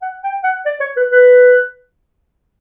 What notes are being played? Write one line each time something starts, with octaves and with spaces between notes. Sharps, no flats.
F#5
G5
F#5
D5
C#5
B4
B4